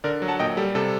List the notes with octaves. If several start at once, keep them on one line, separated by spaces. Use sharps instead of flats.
D3 A#4 D5
F#3
F#5 A5
A#2 D#5 G5
G3 A4
C3 A4